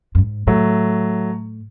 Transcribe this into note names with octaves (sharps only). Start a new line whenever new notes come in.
F#2
G#2
A2 F#3 A3